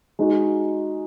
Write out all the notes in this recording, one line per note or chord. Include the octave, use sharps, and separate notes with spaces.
G#3 D#4 F#4